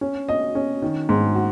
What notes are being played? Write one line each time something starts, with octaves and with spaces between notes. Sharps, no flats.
C#4
D#5
C#4
D#3
G#2
F#4